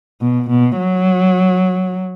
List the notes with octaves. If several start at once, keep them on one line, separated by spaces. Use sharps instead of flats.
B2
B2
F#3